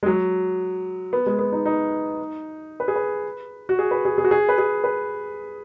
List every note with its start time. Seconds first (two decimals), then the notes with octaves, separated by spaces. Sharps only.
0.03 G#3
0.06 F#3
1.13 B3
1.26 G#3
1.39 B3
1.52 D#4
1.66 D#4
2.80 B4
2.88 G#4
2.96 B4
3.69 F#4
3.79 G#4
3.91 B4
4.05 G#4
4.18 G#4
4.24 F#4
4.31 G#4
4.49 B4
4.58 G#4
4.84 B4